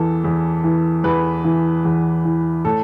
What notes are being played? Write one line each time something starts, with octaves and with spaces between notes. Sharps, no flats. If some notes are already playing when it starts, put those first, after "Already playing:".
Already playing: E2 E3 A4
E2
E3
E2 B4
E3
E2
E3
A2 A4